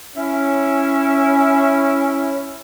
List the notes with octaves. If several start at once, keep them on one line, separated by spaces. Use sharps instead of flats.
C#4 E4